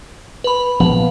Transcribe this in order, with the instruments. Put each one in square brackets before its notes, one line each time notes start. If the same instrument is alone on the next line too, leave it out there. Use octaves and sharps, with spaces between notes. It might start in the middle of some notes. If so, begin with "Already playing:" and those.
[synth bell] B4 B5
[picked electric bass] A#1 F3 B3 [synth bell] B4